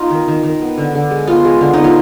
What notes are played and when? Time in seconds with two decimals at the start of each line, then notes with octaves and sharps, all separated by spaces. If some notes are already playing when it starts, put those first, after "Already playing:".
Already playing: B3 D#4 F4
0.10 D#3
0.28 D#3
0.43 D#3
0.61 B3
0.78 D3
0.95 D3
1.10 G#3
1.27 B3 F4
1.45 G#3
1.61 D3
1.73 B3 D#4
1.84 F4